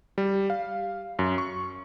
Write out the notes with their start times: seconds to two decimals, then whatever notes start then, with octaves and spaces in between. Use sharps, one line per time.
0.18 G3
0.50 F5
1.19 F#2
1.38 C#6